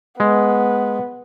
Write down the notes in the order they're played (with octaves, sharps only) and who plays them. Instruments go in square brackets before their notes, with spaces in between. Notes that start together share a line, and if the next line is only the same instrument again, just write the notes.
[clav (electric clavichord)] G#3 [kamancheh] B3